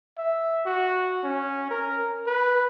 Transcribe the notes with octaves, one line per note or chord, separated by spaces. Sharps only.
E5
F#4
C#4
A#4
B4